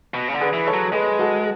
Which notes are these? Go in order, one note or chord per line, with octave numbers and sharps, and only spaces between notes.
B2
C#3
D3
G#4 B4
E3
A4 C#5
F#3
G#3 G#4 B4
F#4 A4